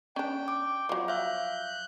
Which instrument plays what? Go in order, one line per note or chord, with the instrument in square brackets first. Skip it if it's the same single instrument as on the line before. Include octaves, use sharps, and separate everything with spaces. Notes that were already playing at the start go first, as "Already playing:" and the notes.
[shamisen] C#4 D4 [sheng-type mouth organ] G5
[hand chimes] D6
[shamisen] F3 F#3
[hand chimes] E5 F5 [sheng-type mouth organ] F#6 G6